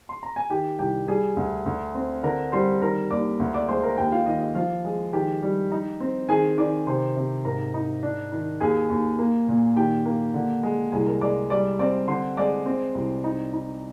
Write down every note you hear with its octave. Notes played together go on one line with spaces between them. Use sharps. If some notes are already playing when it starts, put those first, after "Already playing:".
C6
A#5
G#5
D#3 G4 G5
C2 G4 G5
G3 G#4 G#5
D2
D2
C4
D3 A#4 A#5
G3 C5 C6
D#3 A#4 A#5
D#2 D5 D6
D2
D5 D6
G#3 C5 C6
A#4 A#5
D#2 G4 G5
F4 F5
D#3 D#5
D#5
F3 F4 F5
G#3
D#3 G4 G5
G3
D#4
C4
D#3 G#4 G#5
D#3 D5 D6
C3 C5 C6
C3
G#2 A#4 A#5
D#4
D4
D#3
D#2 G#4 G#5
D#2
A#3
A#2
D#3 G4 G5
A#3
D3
G#3
C2 G#4 G#5
A#4 A#5
G#3 D5 D6
G3 D5 D6
C4 D5 D6
D3 C5 C6
G#3 D5 D6
C4
C2
D#4
D#4